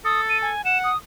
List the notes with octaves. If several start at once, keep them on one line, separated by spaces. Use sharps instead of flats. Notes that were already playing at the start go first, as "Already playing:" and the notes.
A4 D#6
D#7
G#5
F#5 E7
D#6